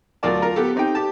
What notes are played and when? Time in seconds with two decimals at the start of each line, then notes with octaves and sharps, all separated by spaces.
0.23 D2 F#3 F4 A#4 D5 A5
0.42 F4 A#4 A#5
0.56 B3 G4 A4
0.76 C4 D#4 G4 G5
0.95 G4 A5